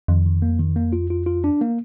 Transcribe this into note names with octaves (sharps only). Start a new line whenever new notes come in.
F2 D#3
D#3
A#3
D#3
A#3
F4
F4
F4
D4
A#3